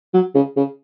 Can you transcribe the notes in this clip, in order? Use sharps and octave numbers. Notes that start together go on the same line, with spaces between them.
F#3
C#3
C#3